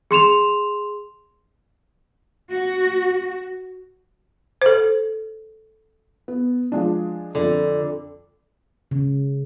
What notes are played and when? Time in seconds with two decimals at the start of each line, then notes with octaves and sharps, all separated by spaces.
0.11 G#4 C6 E7 F7
2.51 F#4
4.62 A4 C5
6.28 B3
6.72 F3 G#3 D4
7.35 F2 D3
8.91 C#3